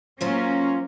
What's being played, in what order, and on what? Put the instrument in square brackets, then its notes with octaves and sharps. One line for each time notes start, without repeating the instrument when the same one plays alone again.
[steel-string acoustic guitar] F#3 F4 C5 [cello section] A#3 C#4